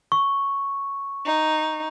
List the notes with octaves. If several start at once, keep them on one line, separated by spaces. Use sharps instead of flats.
C#6
D#4